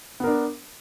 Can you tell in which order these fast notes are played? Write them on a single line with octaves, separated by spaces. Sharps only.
B3 A#4 D4